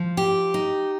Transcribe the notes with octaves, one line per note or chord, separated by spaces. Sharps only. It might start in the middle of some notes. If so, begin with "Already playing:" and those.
Already playing: F3
G4
D#4